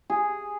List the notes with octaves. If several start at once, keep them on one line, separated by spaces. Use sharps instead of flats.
G#4